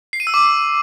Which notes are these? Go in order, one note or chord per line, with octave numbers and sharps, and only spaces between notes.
C7
D#7
E6
D6